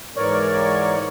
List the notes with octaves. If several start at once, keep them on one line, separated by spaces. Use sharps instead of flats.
G#2 E3 A#4 C#5 D5 C#6